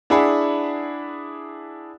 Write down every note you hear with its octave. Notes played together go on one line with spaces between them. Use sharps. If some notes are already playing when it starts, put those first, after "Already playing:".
D4 E4 G#4 F#5 B5